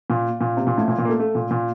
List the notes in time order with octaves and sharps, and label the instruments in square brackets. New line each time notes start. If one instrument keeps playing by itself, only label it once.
[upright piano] A#2
A#2
C3
A#2
A2
A#2
A#2
A#3
A3
A3
A#2
A#2